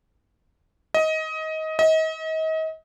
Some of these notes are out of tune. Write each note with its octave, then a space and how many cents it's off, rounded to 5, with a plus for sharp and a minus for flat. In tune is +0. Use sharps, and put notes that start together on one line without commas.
D#5 +20
D#5 +35